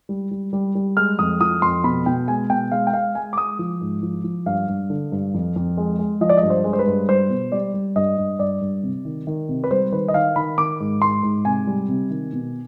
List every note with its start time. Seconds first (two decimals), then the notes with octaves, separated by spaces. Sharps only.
0.09 G3
0.31 G3
0.53 G3
0.75 G3
0.97 G#3 F6
1.19 F2 D#6
1.40 F3 D#6
1.62 F2 C6
1.84 B2 B5
2.06 B2 G5
2.28 G#3 G#5
2.50 B2 G5
2.71 G#3 F5
2.87 G5
2.93 G#3 F5
3.15 G#3 G#5
3.33 D6
3.37 G#3 D#6
3.59 F3
3.81 G#2
4.03 F3
4.24 F3
4.46 G2 F5
4.68 G2
4.90 D3
5.12 G2
5.34 F2
5.56 F2
5.77 G#3
5.99 G#3
6.21 F3 D#5
6.29 D5
6.37 D#5
6.43 G2
6.50 C5
6.64 G#3
6.73 C5
6.79 B4
6.86 G2
7.09 G3 C5
7.30 B2
7.52 G3 D5
7.74 G3
7.96 G2 D#5
8.18 G2
8.39 G2 D5
8.61 G2
8.83 C3
9.05 D#3
9.27 D#3
9.49 C3
9.64 B4
9.71 G3 C5
9.92 D#3 B4
10.08 D#5
10.14 D#3 F5
10.36 D#3 B5
10.58 D#3 D6
10.80 G#2
11.02 G#2 C6
11.23 G#2
11.45 C3 G#5
11.67 G3
11.89 C3
12.10 D#3
12.33 B2